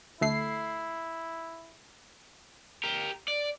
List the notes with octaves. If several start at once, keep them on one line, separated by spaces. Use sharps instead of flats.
D2 A3 E4 C7
G4 A#4
D5